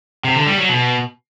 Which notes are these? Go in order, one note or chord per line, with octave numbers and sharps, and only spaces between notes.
C3
D3
G3
F#3
B2